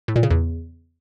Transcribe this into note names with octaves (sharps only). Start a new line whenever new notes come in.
A2
A#2
C#3
E2